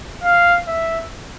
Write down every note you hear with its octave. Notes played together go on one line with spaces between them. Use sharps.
F5
E5